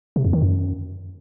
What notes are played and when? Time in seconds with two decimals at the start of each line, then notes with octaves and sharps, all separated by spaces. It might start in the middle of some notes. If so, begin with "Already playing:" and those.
0.16 C3
0.25 F2
0.33 D#3
0.42 F#2